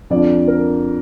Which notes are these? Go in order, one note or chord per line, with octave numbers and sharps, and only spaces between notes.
F2 D3 F3 D5
A#4